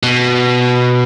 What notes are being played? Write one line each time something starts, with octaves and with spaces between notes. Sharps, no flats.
B2